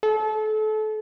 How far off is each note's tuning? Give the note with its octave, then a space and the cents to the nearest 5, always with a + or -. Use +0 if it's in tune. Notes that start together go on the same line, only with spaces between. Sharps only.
A4 -30